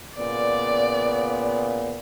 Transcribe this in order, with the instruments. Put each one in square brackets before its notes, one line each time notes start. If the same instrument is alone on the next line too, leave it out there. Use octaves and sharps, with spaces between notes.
[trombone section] A#2 C#3 B3 [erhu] D5